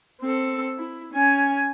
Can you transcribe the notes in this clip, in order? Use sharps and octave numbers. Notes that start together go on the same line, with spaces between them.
C4 A4
E4
C#4 G#5